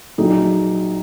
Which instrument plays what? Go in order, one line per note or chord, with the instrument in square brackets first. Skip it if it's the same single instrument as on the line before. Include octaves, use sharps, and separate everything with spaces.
[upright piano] A#1 A#2 F#3 D#4 G#4